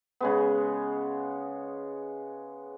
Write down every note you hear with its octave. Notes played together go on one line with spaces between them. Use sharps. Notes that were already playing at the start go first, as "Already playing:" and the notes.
C#3 G#3 B3